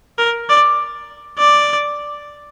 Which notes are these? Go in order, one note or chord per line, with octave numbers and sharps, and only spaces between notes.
A#4
D5
D5